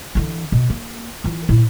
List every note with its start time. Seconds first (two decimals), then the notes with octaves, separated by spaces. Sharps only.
0.15 D3 E3
0.52 B2
0.70 A#3
1.24 E3 F4
1.49 A#2 E4